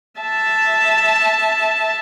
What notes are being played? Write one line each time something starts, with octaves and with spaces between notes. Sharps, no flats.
E5 A5